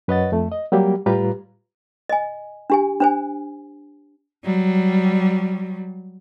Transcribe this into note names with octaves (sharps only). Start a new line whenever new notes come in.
F#2 B4 C#5 D#5 F#5 A6
F2 A3
D#5
F#3 G3 A#3 G4
A2 G3 F4 G4 B4 A#5
D#5 G#5
D4 G4 G#5
D4 C5 G#5
F#3 G3